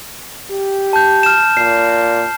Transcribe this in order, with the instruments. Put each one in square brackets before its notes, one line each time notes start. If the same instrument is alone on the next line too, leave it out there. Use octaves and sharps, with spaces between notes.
[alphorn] G4
[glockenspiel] A5 G6
F6 E7
[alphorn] A#2 [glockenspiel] C7